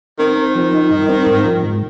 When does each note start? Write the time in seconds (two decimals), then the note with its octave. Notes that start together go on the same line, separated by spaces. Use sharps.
0.19 D#3 C4
0.37 C4
0.55 F3
0.73 D#4
0.91 G2
1.09 C4
1.26 G#2
1.45 F3
1.63 G#2